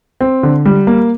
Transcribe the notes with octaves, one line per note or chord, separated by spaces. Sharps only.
C4
D3
G3
A#3